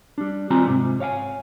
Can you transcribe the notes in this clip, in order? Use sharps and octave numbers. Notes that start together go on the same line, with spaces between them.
G3 D4
D#3 G3 C4 F4 G#5 A#5
G#2 C3
C#5 F5 F#5 G#5